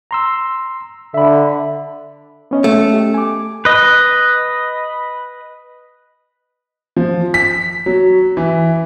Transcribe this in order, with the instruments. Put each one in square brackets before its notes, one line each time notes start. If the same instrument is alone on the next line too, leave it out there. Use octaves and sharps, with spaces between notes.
[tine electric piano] A#5 C6 E6
[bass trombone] D3 [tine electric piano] E5 B5
[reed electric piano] B3 C#4 D#5
[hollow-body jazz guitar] A3
[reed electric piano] G4
G#5 D6
[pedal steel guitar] B4 D#5
[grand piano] F3
B6
F#3
E3